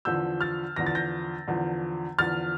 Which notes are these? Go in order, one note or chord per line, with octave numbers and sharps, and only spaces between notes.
E2 D3 F3 E6 G6
F6 A6
E2 D3 F3 A#6
A6
G6 A#6
E2 D3 F3
E2 D3 F3 F6 A6